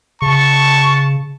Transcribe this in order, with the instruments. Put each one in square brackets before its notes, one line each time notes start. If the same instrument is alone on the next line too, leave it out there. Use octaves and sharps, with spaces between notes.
[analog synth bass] C#3 [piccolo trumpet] A5 [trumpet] C#6